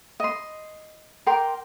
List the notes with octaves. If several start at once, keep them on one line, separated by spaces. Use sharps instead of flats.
D#5 C6
A#4 G5 C6 D6